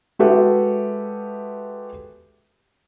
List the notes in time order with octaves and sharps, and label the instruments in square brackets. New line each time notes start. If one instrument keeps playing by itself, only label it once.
[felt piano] G#3 F#4 G4 A4 B4 E5